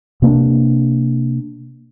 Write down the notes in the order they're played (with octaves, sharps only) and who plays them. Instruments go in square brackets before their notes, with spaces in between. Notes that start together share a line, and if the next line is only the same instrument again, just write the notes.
[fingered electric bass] C3 A#3 B3 D4